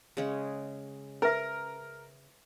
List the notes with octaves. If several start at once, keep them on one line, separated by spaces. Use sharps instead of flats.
C#3 G#3 C#4
A#4 B4 E5